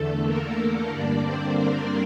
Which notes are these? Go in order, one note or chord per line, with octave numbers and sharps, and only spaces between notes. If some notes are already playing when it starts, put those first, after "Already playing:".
Already playing: E2 D3 A3 A4
A#3 A#4
A#3 A#4
G2 D3 G3 A#3 D4 D5
C4 C5
A#3 A#4